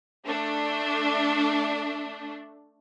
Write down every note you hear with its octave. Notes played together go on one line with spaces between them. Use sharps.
A3 D4